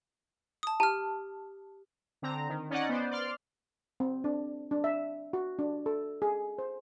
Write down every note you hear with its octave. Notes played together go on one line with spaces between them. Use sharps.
A5 D#6
G4 A5 F6
D3 C4 A#5
D#3
C#4 D#4 D5 D#5 F#5
B3 C5 D5
D5 C6 F6
C4
D4
D4
E5
F#4
D4
A4
G#4
C5